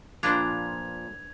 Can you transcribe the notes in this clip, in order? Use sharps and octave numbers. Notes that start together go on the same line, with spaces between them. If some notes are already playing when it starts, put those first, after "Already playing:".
A#2 F3 D4 F4 B4 C5 G#6 F7